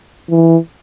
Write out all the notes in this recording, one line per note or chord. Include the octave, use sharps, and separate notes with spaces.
E3